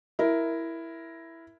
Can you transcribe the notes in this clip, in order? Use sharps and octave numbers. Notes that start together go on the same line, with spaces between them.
E4 A#4